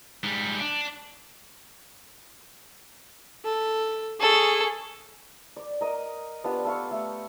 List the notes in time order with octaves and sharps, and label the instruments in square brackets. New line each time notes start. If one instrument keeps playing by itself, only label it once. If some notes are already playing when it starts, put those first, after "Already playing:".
[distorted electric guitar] G#2 G3
D4
[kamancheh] A4
[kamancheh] G#4 C#6 [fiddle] A4
[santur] D5
A#4 D#5
B3 D4 F4 G4
A4 F5 C#6
A3